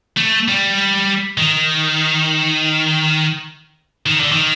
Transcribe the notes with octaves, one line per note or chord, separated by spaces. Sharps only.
A3
G3
D#3
D#3
D3
D#3